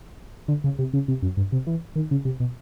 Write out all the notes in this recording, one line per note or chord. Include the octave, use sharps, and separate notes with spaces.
D3
C#3
C3
C#3
C3
F#2
G2
C3
E3
D#3
C#3
C3
B2